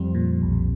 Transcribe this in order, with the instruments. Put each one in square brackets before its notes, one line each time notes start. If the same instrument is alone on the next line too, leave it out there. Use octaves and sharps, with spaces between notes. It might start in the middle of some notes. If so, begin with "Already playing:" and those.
Already playing: [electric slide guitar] F2 [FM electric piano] G3 C4
[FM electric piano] A#2
B1